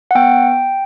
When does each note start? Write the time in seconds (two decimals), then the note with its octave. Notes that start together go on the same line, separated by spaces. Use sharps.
0.11 F#5
0.15 B3 G5